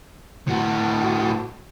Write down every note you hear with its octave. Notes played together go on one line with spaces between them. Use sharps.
A2 F#4